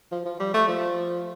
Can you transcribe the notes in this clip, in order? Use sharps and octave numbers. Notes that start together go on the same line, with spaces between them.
F3
F3
G3
A3
F3